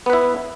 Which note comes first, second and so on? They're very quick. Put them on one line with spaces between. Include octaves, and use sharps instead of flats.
B3 B4 E4